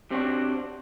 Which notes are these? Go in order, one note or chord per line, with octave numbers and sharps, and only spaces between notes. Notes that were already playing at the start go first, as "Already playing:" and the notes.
C3 C4 D4 F#4